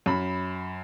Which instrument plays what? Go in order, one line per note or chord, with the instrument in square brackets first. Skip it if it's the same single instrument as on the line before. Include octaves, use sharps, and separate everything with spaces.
[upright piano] F#2 B5